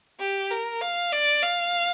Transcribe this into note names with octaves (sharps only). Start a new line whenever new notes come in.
G4
A#4
F5
D5
F5